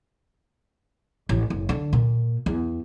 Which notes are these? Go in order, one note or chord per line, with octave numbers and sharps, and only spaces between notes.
A1
F#1
D3
A#2
E2